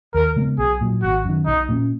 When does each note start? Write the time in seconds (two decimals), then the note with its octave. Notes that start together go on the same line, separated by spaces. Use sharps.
0.14 D#2 A#4
0.36 C#3 G#3 B3
0.58 B1 G#4
0.81 A#2 F#3
1.02 G#1 F#4
1.25 F#2 D#3
1.46 B1 D#4
1.69 A#2 F#3 C#4